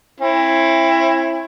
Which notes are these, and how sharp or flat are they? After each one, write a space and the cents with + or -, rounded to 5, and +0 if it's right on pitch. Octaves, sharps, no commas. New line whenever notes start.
C4 +45 E4 +10